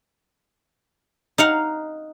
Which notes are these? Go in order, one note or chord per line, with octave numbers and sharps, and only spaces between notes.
D#4 F5 F#5